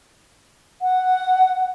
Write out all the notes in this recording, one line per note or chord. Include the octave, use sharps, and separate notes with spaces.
F#5